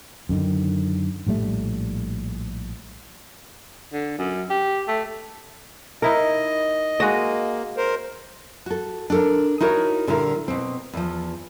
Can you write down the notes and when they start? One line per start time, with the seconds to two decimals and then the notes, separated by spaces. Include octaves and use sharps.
0.29 F#2 D3 D#3
1.27 A#1 A2 G3 A3
3.93 D3
4.18 F#2
4.50 G4
4.88 A3
6.02 D#4 E4 A#4 D#5
7.00 G#3 A#3 F#4 D#5
7.77 A#4 C5
8.66 F#4 A4
9.10 D4 A4 A#4
9.60 D#4 E4 F#4 A#4 C#5
10.07 A#2 D3 G3 E4 A#4
10.48 B2 C4
10.93 E2 F3